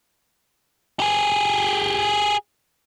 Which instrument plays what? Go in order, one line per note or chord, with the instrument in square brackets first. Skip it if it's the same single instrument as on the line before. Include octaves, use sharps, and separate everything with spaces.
[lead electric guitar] G4 G#4